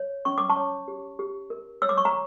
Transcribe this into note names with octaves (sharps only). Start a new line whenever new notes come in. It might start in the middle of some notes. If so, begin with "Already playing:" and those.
Already playing: C#5
C#4 C#6
D6
A5 C#6
C#5
G4
G4
A#4
C#5 E6
D6
C#6
A#5